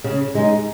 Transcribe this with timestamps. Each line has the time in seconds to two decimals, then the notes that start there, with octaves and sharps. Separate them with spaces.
0.04 C#3
0.35 G#3 D#4